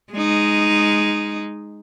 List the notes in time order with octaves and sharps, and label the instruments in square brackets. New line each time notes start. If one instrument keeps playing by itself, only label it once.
[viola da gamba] G#3 D#4